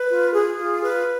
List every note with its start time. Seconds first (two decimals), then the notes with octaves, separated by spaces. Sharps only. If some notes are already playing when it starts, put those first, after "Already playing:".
Already playing: B4
0.09 F4
0.33 G#4
0.57 F4
0.82 B4